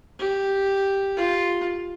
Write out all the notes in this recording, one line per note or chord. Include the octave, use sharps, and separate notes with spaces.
G4
F4